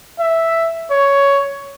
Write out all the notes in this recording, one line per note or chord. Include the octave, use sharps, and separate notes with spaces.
E5
C#5